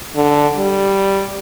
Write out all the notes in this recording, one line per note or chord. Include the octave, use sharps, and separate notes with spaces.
D3
G3